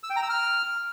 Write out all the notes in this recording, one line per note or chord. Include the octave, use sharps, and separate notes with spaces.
E6
G5
A#5
E6
F6